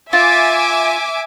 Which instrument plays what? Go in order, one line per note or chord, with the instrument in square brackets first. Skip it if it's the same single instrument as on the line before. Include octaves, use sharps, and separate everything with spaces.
[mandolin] F4 [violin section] E5 G#5 D6